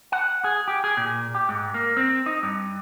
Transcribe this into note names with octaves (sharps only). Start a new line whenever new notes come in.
F#5
G#4
G4
G#4
A#2
G4
G#2
A#3
C4
D#4
G2